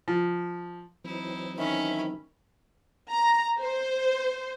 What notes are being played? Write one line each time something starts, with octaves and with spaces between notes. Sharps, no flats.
F3
E3 F#3 C4 D#4 E4
D#3 C#4 E5 B5
A#5
C5